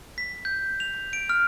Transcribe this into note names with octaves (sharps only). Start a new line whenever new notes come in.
B6
G6
F7
D7
F6